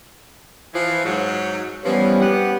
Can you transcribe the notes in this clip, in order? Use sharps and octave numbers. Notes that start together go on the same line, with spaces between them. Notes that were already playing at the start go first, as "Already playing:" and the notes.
E3 F3
G#2 F#3
E3 F3 G3 B3 C#4
G2 B3 G4 F#5